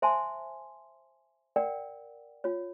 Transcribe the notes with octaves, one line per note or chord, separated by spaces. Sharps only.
C5 E5 G#5 A5 C6
A#4 D5 F#5 G5
F4 C#5